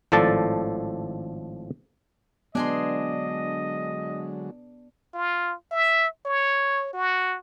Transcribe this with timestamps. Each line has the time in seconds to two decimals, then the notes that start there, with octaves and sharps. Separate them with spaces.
0.12 G#1 A2 F3 A4 D5 A5
2.55 D3 F#3 G#3 B3 D4 G#4 D#5 C6
5.13 F4
5.71 E5
6.26 C#5
6.93 F#4